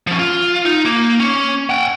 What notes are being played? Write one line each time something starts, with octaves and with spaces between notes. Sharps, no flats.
F3 C#4
F4
D#4
A#3
C#4
F#5 G5